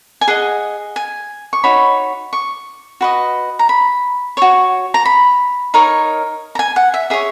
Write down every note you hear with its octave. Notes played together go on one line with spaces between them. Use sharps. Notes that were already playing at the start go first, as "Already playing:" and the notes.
G#5
G#4 D#5 F#5
G#5
C#6
D#4 F#4 C#5 B5
C#6
F#4 B4 D#5
A#5
B5
F#4 C#5 C#6
A#5
B5
D#4 A#4 C#5
A#5
G#5
F#5
E5
G#4 C#5 E5